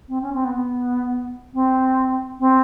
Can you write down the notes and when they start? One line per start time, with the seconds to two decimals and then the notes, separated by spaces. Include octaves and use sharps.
0.08 C4
0.22 C#4
0.34 C4
0.45 B3
0.55 B3
1.54 C4
2.40 C4